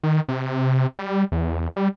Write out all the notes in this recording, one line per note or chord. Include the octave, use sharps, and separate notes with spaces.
D#3
C3
G3
E2
G3